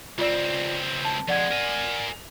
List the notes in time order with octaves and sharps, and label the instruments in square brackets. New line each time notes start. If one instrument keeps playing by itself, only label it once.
[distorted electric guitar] C#2 C4 [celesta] F4 D5
[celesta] A5
[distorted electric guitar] F2 G#3 [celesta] D5 F#5 G#6
[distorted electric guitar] A#4 G#5